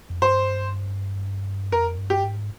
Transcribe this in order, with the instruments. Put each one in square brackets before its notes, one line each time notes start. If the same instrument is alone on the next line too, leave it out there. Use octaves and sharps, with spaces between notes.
[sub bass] F2
[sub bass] G2 [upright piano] C5
[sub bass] F2 [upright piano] A#4
[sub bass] G2
[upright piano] G4
[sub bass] G#2